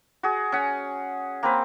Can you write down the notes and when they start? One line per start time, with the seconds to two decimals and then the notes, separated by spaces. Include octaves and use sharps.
0.23 F#4 G#4
0.52 C#4 F#5
1.43 A#3 C4 B4